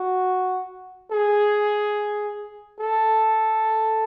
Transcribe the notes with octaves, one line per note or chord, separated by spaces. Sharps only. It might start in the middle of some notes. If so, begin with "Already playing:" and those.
Already playing: F#4
G#4
A4